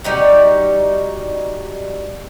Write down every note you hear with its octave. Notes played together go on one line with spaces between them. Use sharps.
G3 D#4 F#4